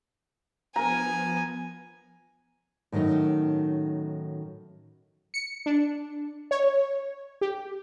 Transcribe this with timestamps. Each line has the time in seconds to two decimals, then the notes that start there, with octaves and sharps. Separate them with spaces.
0.76 F3 B3 A#4 G#5 A#5
2.92 A2 D#3 F#3 C#4 D#4
5.34 C#7
5.66 D4
6.51 C#5
7.41 G4